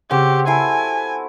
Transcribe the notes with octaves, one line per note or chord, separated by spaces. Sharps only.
C#3 C4 F#4 G4
E4 A4 G#5 C7